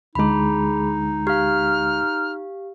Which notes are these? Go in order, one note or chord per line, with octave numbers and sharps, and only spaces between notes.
D2 D3 G#3 D#4 G#4 B5
G4 F5 F6